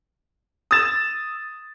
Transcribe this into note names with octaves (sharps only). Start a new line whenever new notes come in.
D#6 E6 A6 E7